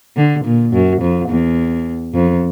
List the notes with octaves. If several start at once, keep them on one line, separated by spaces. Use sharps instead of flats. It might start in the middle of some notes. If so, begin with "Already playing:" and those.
D3
A#2
F#2
F2
E2
F2